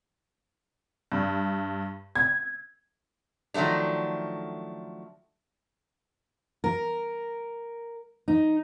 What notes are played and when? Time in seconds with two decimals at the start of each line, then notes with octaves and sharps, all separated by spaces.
1.12 G2
2.15 G#6
3.54 D#3 F3 F#3 A3 D4
6.64 A#4
8.28 D#4